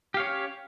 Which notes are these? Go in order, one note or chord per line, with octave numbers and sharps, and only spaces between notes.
C#4 G4 C#5 F5